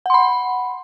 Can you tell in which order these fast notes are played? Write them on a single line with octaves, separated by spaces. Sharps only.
F#5 C6 B5